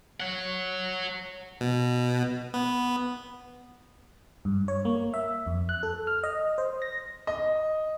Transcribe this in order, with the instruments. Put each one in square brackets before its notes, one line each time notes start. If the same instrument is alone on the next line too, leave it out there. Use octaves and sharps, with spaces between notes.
[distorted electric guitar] C#5 F#5
[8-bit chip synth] B2
B3
[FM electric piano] G2
C#5
A#3
E5
F2
F#6
A4
F6
D#5
C5
A#6
[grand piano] D#5